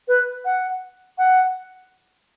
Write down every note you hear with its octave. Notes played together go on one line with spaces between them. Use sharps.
B4
F#5
F#5